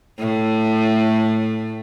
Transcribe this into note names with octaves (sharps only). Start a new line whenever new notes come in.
A2 A3